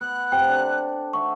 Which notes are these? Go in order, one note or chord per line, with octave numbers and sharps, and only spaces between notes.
B3 F#6
C3 G5
D4 A4
C5 E5 F#5 C#6